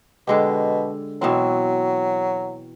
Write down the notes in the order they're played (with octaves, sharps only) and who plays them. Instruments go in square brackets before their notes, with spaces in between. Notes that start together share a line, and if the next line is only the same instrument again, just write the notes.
[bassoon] B2 [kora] D3 G#3 G4
[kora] B2 E3 C4 [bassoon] F#3